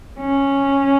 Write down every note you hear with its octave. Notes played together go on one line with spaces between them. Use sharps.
C#4